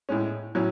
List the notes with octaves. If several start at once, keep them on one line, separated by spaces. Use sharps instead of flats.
A2 G#3 C#4
A2 F#3 C#4